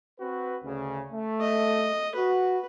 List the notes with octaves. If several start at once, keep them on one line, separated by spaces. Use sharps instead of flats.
C4 F#4 B4
D2 C#3
A3
D#5
F#4 B4